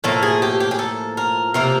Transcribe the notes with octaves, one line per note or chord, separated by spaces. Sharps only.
A2 F3 A#3 A4
G#4
G4
G4
G#4
A4
A#4
C3 F3 A#3 A#4